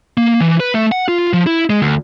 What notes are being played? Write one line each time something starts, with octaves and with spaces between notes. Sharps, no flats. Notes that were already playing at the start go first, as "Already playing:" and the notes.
A#3
E3
B4
A3
F#5
F4
F3
E4
G#3
D2